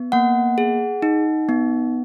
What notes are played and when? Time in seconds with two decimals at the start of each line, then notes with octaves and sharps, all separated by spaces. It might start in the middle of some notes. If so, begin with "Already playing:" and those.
Already playing: B3
0.12 A#3 F#5
0.58 G#4
1.02 D#4
1.49 B3